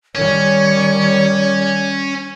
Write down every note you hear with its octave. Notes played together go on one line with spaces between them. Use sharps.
D#3 G3 C#4 C#5